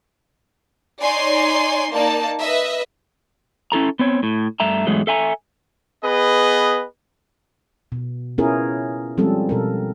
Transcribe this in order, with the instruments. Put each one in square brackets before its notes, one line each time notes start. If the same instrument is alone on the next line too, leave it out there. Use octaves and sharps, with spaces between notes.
[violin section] D#4 C#5 D5 G#5 C6
A#3 D#4 D5 A5
B4 D#5 E5
[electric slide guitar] C#4 E4 A4 A#5
B3 C4 C#5
A2
G2 A3 E5 A#5
E2 G#2 F#3 G#3 A3
A4 E5 G#5 A#5
[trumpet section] B3 G#4 B4 D#5
[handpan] B2
B3 C#4 E4 F4 G#4 A#4
F3 G3 G#3 C4 C#4 A4
B2 A4 A#4